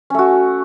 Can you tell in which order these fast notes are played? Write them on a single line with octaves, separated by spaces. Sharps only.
C#4 A3 F#4